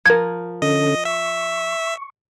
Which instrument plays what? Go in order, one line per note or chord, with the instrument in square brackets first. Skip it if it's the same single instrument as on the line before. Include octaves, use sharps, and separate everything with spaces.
[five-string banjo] F3 A#4 [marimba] G#6
[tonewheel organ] D3 C#4 A4 [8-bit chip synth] D#5
[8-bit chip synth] E5 [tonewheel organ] C#6